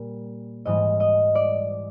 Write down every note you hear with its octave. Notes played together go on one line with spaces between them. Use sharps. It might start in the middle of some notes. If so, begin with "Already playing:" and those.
Already playing: A#2 G3
G#2 E3 G3 D#5
D#5
D5